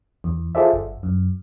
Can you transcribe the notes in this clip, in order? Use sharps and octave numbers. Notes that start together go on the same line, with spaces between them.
E2
F4 G#4 A4 C5 D5 E5
G1
F#2